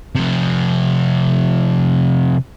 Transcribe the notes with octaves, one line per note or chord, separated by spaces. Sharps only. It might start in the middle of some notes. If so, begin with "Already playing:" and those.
C3 F3